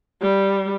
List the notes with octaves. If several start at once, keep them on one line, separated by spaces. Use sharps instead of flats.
G3